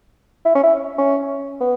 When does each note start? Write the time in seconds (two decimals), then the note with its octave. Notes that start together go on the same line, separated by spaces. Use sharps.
0.45 E4
0.55 C#4
0.63 E4
0.98 C#4
1.60 B3